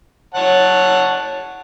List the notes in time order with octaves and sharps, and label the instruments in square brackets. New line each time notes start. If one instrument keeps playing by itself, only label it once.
[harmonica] C#5 F#5 A5